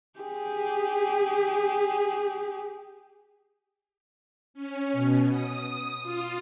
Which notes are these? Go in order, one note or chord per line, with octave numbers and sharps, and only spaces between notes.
G4 G#4
C#4
B2
D#6
F4